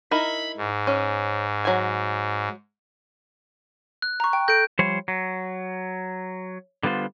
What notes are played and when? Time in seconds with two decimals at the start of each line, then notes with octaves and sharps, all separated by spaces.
0.11 D#4 E4 A#4 B5
0.57 G#2
0.87 C#4
1.65 F#3 G#5
4.02 F#6
4.20 A#5 C#6
4.33 G5
4.48 A4 G6 A#6 D7
4.79 F3 G3 C5 C#5
5.08 F#3
6.83 D3 G3 B3 F4 C5